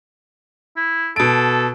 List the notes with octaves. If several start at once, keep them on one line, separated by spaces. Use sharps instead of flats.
E4
B2 A4 D7